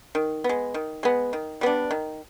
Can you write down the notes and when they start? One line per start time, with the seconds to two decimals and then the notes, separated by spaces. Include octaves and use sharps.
0.15 D#3
0.44 B3
0.49 G#3
0.74 D#3
1.03 G#3 B3
1.33 D#3
1.61 G3 B3 D4
1.91 D#3